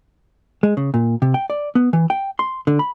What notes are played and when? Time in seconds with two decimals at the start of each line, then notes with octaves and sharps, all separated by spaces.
0.63 G#3
0.77 C#3
0.94 A#2
1.22 C3
1.34 G5
1.50 D5
1.75 B3
1.93 E3
2.10 G5
2.39 C6
2.67 D3
2.79 B5